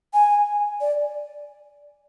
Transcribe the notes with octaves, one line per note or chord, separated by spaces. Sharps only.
G#5
D5